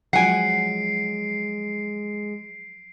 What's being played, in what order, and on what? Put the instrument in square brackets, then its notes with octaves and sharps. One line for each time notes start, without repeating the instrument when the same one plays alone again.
[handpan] F3 F#3 [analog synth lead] G#3 [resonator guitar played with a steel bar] F#5 G#5 [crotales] C7 D7